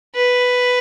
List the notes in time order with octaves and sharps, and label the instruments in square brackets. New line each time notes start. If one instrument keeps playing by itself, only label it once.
[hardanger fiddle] B4